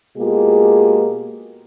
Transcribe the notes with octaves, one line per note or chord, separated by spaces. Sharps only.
B2 G#3 A#3 F4 G4 G#4